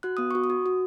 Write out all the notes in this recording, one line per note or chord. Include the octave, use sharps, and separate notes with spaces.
F#4 F#6
B3 D#6
F#4 C#6
D#6
F#4
F#4